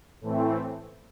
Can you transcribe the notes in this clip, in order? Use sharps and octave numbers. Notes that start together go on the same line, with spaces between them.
A2 E3 A3 C4